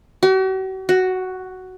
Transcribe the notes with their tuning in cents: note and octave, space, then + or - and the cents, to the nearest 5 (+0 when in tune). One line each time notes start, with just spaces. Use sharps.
F#4 +45
F#4 +5